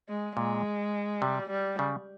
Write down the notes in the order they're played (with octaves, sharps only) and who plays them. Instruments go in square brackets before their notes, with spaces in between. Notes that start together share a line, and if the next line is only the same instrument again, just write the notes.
[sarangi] G#3
[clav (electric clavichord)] A#2 [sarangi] G#3
[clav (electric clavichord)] C3 [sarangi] G3
[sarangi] G3
[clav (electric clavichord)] C#3